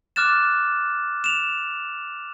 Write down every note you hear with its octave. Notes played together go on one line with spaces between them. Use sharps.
D6 F6 F#6 A6 E7
E7 F7